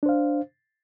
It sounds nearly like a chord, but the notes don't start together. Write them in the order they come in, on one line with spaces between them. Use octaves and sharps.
D4 C5 F5